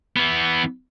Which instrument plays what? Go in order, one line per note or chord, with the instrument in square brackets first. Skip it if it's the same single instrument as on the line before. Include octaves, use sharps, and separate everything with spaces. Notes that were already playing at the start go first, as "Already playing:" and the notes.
[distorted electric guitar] E3 B3